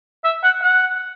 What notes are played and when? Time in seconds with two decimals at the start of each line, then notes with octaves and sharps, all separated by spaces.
0.24 E5
0.44 F#5
0.63 F#5